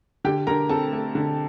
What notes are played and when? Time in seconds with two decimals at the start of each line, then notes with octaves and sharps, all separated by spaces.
0.24 D3 G4 G5
0.47 D3 A#4 A#5
0.69 C4 A4 A5
0.93 A3
1.15 D3